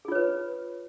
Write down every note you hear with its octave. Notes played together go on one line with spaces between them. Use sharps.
F4 G#4 B4 C#5